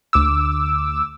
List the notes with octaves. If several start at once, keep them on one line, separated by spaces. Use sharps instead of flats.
D2 D6 E6